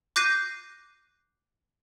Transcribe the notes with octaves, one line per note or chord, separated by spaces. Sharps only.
D6 F#6 G6 A#6 C7 D#7